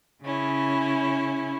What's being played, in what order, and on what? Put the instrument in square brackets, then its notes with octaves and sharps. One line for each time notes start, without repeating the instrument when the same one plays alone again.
[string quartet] C#3 C#4 E4